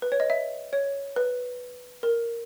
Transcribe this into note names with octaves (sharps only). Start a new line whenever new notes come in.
B4
C#5
D#5
E5
C#5
B4
A#4